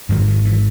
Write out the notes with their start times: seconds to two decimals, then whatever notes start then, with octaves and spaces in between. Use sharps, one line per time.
0.09 G#1 G#2 D#3 F#3
0.28 D#3
0.45 E3